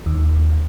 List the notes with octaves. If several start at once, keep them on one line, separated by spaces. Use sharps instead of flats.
D#2